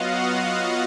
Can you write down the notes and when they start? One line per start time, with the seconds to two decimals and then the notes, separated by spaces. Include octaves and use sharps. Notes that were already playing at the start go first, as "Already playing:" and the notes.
Already playing: F#3 B3 F4 F#4 D#5 F5 F#5